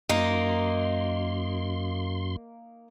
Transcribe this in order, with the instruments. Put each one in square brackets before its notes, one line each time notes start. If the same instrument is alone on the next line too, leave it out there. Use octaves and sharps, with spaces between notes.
[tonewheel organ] F#2 C6 [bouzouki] A#3 D#4